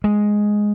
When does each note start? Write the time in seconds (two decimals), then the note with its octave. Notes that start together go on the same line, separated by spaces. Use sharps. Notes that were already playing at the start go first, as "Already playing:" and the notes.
0.04 G#3